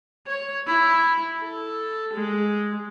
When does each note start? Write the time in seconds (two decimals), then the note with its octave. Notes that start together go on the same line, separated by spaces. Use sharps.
0.27 C#5
0.67 E4
1.41 A4
2.13 G#3